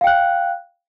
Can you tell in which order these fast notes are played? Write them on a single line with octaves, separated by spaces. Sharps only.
F5 G5 F#6